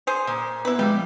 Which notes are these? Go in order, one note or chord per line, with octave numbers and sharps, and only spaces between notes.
G#4 C5
A#2
B3 E4 B4
F3 G3 G#3 G4